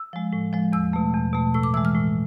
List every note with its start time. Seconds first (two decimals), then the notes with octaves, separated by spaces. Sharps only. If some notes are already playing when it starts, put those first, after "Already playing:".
Already playing: E6
0.13 F3 G#3
0.33 A2
0.53 F3 G#3
0.73 E2 E6
0.93 B2 A3
1.14 E2
1.33 B2 A3
1.54 A2 E6
1.63 D6
1.74 E3 E6
1.77 G#3
1.85 F6
1.95 A2